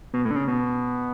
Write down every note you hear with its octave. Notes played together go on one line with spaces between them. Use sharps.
B2
A2
D3
C#3
B2